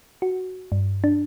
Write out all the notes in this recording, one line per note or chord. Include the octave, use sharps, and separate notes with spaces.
F#4
G2
D4